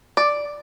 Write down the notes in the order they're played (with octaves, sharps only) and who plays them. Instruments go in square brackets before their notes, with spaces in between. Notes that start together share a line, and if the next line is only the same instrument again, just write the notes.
[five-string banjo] D5